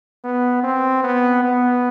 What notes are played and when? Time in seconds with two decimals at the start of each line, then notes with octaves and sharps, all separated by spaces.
0.24 B3
0.64 C4
1.04 B3
1.43 B3